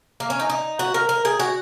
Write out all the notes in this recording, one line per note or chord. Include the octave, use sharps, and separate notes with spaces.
A#3
C#4
D#4
D#4
F#4
A#4
A#4
G#4
F#4